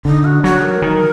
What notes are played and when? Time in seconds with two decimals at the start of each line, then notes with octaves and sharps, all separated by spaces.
0.05 D3 D#4
0.25 F#4
0.44 F#3 F#4
0.64 A#4
0.82 D#3